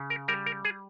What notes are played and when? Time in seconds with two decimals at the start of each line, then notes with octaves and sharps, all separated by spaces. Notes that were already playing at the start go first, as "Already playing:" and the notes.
Already playing: C#3
0.10 A#4
0.28 G3 A#4
0.46 A#4
0.65 G#4